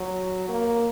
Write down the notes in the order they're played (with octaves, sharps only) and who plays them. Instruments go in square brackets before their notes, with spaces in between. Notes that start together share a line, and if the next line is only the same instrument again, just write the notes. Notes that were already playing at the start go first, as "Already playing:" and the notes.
Already playing: [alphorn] F#3
A#3